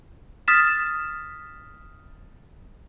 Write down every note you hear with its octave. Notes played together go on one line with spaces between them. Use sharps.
D#6 F6 A6 B6 E7